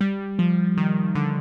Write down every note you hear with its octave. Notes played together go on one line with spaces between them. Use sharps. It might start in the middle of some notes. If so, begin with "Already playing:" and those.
G3
F3
D#3
D3